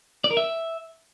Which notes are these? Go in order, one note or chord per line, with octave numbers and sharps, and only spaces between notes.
D5
A#4
E5